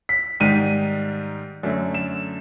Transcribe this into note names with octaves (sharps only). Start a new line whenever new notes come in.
B6
G#2 D#3 G3 D#7
F#2 D3 F#3 A3
E7